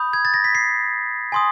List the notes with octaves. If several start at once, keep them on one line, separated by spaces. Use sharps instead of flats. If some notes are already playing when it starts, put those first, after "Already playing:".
Already playing: B5 D#6 G6
G#6
A6
A#6
B6
C7
G#5 C6 D#6